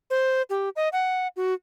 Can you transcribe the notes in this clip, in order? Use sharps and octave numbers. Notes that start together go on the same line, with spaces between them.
C5
G4
D#5
F#5
F#4